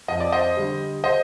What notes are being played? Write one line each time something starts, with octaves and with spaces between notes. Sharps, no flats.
F2 D#5
D5
C5 D#5
D3 G3
C5 D#5